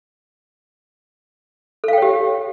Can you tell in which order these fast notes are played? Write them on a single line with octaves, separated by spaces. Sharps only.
A4 F5 G5 C#5 G4